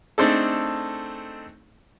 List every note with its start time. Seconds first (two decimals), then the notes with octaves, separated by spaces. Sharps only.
0.18 A3 C4 D4 D#4 G#4 A4